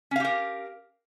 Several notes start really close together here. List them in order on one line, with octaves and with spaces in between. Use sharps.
C#4 F5 G4 A#4